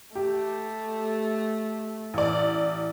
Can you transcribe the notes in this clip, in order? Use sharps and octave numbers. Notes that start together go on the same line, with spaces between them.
A3 G4
A1 D5